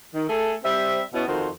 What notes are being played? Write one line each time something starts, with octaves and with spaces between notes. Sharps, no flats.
D#3
A3 G#4 A4
G3 C4 C5 E5
B2 B3 C#4 E4
F2 D#3 F#4 C5